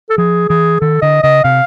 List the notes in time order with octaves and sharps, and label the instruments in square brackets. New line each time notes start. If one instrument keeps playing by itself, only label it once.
[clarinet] A4
[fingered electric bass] F3 [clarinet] G#4
[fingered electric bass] E3 [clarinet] G#4
[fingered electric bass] D#3 [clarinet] A4
[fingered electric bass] D3 [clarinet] D#5
[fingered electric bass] C#3 [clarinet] D#5
[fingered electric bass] C3 [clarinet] F5